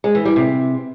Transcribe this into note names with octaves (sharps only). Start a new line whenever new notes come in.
G#3
E3
G3
C3